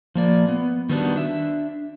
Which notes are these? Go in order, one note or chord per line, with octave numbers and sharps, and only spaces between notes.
F3 A#3 D5
B3
D#3 G3 A3 B3 D4 F#4
D4 E5